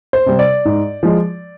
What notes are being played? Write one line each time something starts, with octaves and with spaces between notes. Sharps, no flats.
C5
C3 G3
D5
G#2
F3 G#3